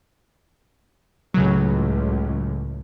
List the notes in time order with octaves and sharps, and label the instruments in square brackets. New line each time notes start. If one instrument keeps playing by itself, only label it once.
[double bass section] C#2 A2 [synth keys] C#3 F#3